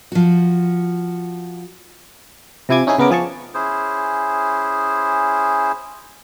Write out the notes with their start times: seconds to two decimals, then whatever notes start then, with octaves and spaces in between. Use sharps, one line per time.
0.12 F3 F#4
2.69 C3 F3 E4 G#5 D6 G#6
2.87 C#4 D#4 E4 G#4
2.98 C#3 B3 A#4 D6
3.10 F3 G#4 A5 C#6
3.54 C#4 E4 G#4 C5